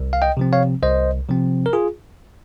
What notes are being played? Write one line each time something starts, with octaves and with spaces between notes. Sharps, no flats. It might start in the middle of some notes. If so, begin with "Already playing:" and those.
Already playing: C2
F5
D#5 G5
C3 F3 C4
C#5 F5
C2 C5 D#5
C3 F3 C4
A#4
F4 G#4